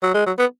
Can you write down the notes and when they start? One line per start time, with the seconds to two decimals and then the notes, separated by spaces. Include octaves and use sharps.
0.03 F#3
0.14 G#3
0.26 F#3
0.38 B3